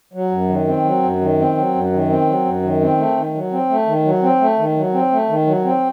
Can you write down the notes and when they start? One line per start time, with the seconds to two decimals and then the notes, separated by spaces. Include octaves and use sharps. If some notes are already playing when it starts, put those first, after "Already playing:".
0.13 F#3
0.31 F#2
0.49 D#3
0.67 C4
0.84 F#3
1.03 F#2
1.21 D#3
1.39 C4
1.57 F#3
1.75 F#2
1.92 D#3
2.09 C4
2.27 F#3
2.46 F#2
2.63 D#3
2.81 C4
2.98 A3
3.16 D#3
3.34 F#3
3.52 C4
3.70 A3
3.87 D#3
4.04 F#3
4.23 C4
4.41 A3
4.58 D#3
4.77 F#3
4.94 C4
5.12 A3
5.29 D#3
5.47 F#3
5.65 C4